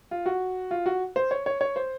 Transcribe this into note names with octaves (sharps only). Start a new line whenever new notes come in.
F4
F#4
F4
F#4
C5
C#5
C#5
C#5
C5